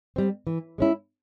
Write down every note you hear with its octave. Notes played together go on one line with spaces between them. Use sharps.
G3 C4
E3
G#3 C#4 E4